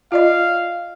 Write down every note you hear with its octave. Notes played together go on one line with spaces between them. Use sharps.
F4 D5 D#5 F5